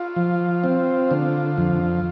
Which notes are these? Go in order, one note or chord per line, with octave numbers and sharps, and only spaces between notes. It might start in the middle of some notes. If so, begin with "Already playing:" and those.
Already playing: F4
F3
C4
D3
F2